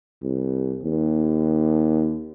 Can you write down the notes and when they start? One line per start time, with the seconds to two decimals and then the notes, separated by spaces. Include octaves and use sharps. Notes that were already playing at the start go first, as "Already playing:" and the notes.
0.23 C2
0.84 D#2